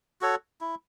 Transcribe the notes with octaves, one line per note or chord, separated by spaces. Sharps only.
F#4 A4 C#5
E4